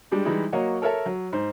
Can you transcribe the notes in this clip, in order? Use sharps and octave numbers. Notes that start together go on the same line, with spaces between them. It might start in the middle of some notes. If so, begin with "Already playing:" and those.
G3 G#3 D4 G4
E3 G3 G#3 D#4 E4
F#3 A#3 F#4 C#5 D#5
A4 A#4 C#5 E5 A5
F#3
G#2 C5